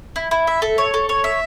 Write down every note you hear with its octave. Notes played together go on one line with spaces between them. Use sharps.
E4
E4
E5
A4
C#5
A4
C#5
E5